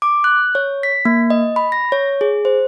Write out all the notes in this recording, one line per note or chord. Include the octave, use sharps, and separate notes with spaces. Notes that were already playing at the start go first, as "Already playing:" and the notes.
D6
F#6
C#5
B6
A#3
D#5
B5
A#6
C#5
G#4
C5